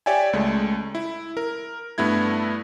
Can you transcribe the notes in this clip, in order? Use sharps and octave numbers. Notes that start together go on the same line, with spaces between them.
G4 C#5 D5 E5 G5 G#5
C#2 G#3 A3
E4
A#4
G2 A3 B3 E4 G#6